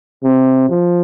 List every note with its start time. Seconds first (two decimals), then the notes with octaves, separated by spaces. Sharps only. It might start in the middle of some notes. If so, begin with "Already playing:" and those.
0.23 C3
0.69 F3